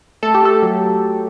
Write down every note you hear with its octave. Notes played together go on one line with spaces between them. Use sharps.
A3 A4
G4
A3 A4
F#3